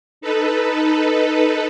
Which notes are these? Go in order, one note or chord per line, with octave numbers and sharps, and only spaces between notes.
D#4 A4 B4